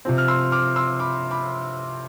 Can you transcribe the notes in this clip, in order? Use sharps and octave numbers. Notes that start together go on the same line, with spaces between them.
C3 F3 C4
F6
C6 E6
D6 F6
C6 E6
B5 D6
B5 D6